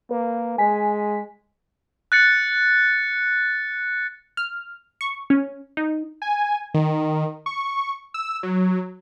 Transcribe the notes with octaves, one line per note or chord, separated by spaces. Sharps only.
A#3 B4
G#3 G#5 B6
F#6 A6 C#7
F6
C#6
C#4
D#4
G#5
D#3
C#6
E6
F#3